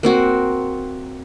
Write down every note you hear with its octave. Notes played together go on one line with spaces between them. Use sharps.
A#3 C4 F#4